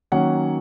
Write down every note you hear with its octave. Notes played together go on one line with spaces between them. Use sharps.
D#3 F#3 A#3 C#4 F#5